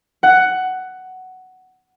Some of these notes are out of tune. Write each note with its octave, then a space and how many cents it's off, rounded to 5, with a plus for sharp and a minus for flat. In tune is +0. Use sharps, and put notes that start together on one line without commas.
F#5 +10